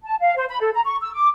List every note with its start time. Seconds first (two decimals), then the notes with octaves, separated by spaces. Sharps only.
0.03 A5
0.19 F5
0.36 C5
0.49 B5
0.60 A4
0.74 A#5
0.85 C#6
1.01 E6
1.14 D6